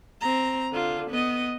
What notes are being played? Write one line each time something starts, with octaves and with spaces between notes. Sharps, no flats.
C4 A#5
D3 F4
B3 D#5